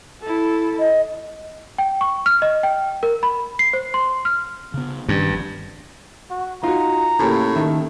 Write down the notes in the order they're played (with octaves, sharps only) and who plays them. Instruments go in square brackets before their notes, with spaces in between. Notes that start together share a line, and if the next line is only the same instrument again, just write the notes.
[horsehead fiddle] E4 A4
[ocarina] D#5
[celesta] G5
C#6
F6
D#5
G5
A#4
B5
C7
C5
C6
F6
[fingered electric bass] C#3 B3
[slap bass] G2 [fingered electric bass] D#3 C#4
[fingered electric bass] G1 F2
[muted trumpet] F#4
[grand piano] D#4 F#4 [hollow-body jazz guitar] F4 [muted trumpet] A#5
[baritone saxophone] A2 [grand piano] C#3 A#3 G4
[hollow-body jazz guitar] D#3 [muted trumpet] A3